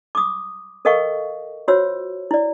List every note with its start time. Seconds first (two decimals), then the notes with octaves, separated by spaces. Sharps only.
0.15 D6 D#6
0.85 A4 A#4 D#5 F5 G5 C#6
1.68 F4 F#4 C5 C#5 E6
2.31 E4 D5